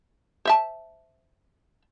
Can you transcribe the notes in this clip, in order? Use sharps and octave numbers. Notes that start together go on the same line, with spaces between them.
C5 E5 A5